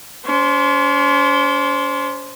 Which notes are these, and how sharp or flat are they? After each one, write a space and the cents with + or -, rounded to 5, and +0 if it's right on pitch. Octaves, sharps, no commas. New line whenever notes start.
C#4 +45 C5 +0